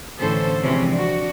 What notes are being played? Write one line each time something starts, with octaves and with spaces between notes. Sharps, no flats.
A2 D3 E3 C#4 A4 C5
C3 E3 F3 G#3 C4 C#4
D4 F#4